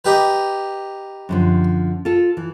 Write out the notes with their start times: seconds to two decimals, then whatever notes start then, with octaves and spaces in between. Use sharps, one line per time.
0.05 D#4 G4 B4
1.29 F#2 D3 F3
2.05 F4 A4
2.37 E3